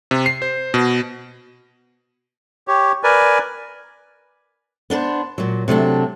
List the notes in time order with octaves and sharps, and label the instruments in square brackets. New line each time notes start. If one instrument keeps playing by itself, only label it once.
[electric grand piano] C3
C7
C5
B2
[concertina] G4 C#5
A#4 B4 D5 G#5
[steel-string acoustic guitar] B3 D4 B4 C5
A#2 F#3
C3 F#3 A3 D4